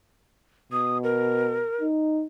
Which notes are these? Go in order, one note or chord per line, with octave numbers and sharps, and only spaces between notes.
B2 D#6
A#4
D#4